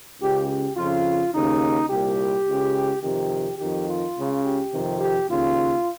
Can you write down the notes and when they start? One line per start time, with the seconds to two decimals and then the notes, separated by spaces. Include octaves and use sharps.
0.20 C#2 C#3 G4
0.48 G4
0.76 F2 C#3 F4
1.33 D#2 C#3 D#4
1.89 C2 A#2 G4
2.46 C#2 C#3
3.02 F2 C3 D#3 G4
3.58 F2 D#3 G4
3.88 F4
4.16 C#2 C#3
4.44 G4
4.72 F2 C3 D#3
5.00 G4
5.29 D#2 C#3 F4